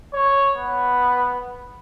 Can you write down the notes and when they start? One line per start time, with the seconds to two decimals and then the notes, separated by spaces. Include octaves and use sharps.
0.13 C#5
0.56 B3